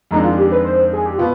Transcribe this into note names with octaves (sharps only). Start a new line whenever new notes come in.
F2 D#3 G#3 D4 D#4
F4
G4
B4
C5
G#4
G4
B2 B3 F4